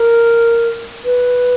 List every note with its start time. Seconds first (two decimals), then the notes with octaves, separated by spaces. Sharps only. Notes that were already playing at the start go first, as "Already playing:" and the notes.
Already playing: A#4
1.05 B4